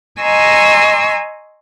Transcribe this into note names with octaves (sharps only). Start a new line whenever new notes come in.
D#5 G#5 A#5 C6 C#6 E6